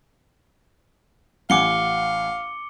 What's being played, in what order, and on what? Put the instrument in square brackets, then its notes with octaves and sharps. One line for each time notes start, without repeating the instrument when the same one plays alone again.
[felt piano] A1 F#5 G#5 [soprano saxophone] F5 [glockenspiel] D6 C#7 G7